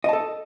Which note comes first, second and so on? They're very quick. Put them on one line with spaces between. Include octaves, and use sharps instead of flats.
D#5 A5 A4